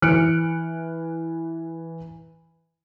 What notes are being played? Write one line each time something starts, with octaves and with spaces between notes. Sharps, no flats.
E3 F6 F#6 C#7 D7